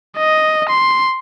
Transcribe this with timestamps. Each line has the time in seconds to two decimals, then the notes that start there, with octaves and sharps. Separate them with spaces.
0.18 D#5
0.69 C6